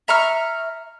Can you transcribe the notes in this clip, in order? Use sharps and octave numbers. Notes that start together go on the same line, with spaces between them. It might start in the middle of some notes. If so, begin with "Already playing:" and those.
E5 A#5 C#6 F6